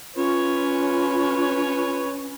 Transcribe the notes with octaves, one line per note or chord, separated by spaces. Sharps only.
C#4 F4 B4 C#5